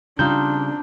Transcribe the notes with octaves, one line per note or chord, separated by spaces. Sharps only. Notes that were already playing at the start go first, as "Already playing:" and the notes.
C#3 G3 C4 D4 D#4 F4 G6